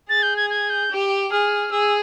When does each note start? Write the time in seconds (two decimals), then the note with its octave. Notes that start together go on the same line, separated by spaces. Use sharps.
0.09 G#4 A6
0.23 G6
0.37 G#6
0.50 G#6
0.70 G6
0.91 G4
1.31 G#4 F6
1.71 G#4 E6